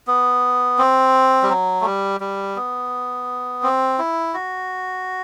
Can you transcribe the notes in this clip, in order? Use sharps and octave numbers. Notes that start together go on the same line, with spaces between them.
B3
C4
G3
F#3
A3
G3
G3
B3
C4
E4
F#4